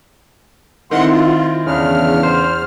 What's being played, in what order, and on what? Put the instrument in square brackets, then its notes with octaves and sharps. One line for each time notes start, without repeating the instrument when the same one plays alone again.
[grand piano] D#3 C4 E4 [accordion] F#5 C6
[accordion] F4
[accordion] E2 F6 [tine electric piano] C#3 D4
[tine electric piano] C5